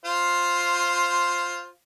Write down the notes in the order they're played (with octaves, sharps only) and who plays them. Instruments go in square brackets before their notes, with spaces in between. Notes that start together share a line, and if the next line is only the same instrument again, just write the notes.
[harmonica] F4 C5